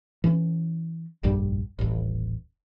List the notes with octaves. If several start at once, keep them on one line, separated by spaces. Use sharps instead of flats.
E3 C#4
F1 A#1 G2 G3
D#1 A1